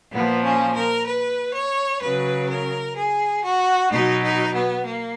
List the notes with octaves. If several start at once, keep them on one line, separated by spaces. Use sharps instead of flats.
A#2 F3 B3
C#4
A#4
B4
C#5
C#3 F#3 B4
A#4
G#4
F#4
B2 F#3 D#4
D#4
B3
A#3